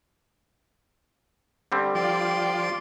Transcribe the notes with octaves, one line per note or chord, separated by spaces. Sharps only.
D3 G3 C4
F3 D5 G5 C6 D6